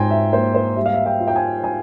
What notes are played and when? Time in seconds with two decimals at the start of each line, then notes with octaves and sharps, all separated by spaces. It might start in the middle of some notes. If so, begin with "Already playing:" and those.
Already playing: G#2 F4 G5 G#5 A#5 C6
0.10 E5
0.32 A#3 C5
0.55 C5
0.76 G3 E5
0.86 F5
0.94 E5
1.06 G5
1.20 F4
1.28 G5
1.36 G#5
1.64 G#5